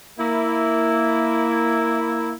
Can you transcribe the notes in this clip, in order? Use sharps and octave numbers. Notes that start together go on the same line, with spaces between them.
A#3 E4